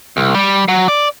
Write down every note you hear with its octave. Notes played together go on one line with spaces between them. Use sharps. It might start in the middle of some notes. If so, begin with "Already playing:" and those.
C2
G3
F#3
D5